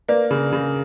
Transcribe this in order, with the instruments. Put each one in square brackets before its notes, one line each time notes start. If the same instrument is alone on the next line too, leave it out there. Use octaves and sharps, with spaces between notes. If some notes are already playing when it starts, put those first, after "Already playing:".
[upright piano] A#3 [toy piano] B4 D5
[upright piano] C#3
C#3